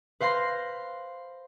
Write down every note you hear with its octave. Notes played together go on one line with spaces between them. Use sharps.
B4 C5 F5 C6 A#6